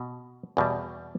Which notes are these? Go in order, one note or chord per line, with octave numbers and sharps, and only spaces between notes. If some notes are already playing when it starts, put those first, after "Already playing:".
Already playing: B2
E2 B2 G3